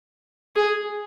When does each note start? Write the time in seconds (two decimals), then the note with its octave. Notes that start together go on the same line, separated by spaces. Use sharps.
0.56 G#4